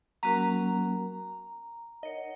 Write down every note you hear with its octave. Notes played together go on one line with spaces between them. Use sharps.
F#3 A#3 C#4 F#4 A#4 A#5
D#4 A#4 C#5 D#5 F#5